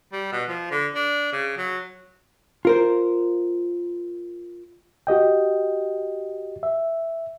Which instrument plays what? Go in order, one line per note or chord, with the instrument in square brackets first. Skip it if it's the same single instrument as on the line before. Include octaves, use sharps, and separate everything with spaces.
[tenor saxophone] G3
B2
F3
D3
D4
C#3
F#3
[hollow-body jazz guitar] F4 A#4 C5
[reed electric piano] F#4 G4 D#5 G5
E5